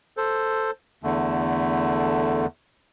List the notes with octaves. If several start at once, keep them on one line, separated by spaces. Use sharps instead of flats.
A4 C5
E2 D3 A3